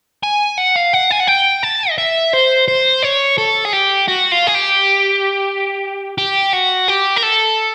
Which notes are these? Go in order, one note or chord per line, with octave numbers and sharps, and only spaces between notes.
G#5
F#5
F5
F#5
G#5
F#5
G5
A5
D#5
E5
C5
C5
C#5
A4
G#4
G4
F#4
F4
G#4
G4
G4
F#4
G4
A#4
A4